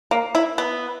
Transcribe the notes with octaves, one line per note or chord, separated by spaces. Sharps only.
A#3
E4
B3